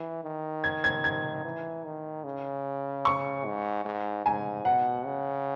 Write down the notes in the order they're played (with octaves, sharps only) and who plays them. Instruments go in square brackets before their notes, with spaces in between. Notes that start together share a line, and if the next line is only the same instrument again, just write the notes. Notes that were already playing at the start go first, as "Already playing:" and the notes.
Already playing: [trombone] E3
D#3
[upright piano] G#6
G#6
G#6
[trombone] E3
D#3
C#3
[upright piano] C#6
[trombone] G#2
G#2
[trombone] G#2 [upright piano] G#5
[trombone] B2 [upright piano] F#5
[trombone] C#3